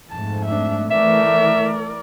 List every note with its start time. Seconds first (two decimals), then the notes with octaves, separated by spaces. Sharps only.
0.10 F2 G#2 A3 A5
0.46 D4 E5
0.91 E3 A3 A#4 D5 E5